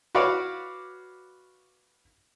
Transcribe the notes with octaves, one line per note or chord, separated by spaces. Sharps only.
F#4 B4 C#5 D5 F5